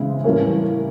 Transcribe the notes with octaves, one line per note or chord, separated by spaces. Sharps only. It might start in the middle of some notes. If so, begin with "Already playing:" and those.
Already playing: C#3 E3 G#3 C4 E4
A2 E3 G3 A#3 C#4